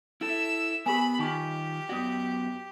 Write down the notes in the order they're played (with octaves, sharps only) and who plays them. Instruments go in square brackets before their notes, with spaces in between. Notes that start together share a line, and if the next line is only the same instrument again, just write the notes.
[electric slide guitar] E4 A4 [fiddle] E5 E6
[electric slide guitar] B3 [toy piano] G4 A#4 G#5 [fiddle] B5
[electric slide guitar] D#3 F4 [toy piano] D#4 C#6 [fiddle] G4
[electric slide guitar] F#2 B3 F#4 [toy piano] D5 D#6